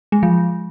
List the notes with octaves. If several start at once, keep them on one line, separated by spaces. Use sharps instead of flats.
G#3
F3